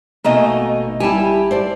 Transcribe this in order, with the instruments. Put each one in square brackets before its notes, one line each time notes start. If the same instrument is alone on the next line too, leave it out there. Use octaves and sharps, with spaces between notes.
[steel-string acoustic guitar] B2 A3 D#4 [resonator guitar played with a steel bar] A#3 D#5 G#5
[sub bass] G#1
[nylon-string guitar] G3 E4 [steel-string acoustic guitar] G4 [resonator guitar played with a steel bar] G#5 A5
[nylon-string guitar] C5 D5 A5